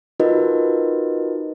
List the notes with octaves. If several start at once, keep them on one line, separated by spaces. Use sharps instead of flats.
D#4 F4 F#4 A#4 B4 D#5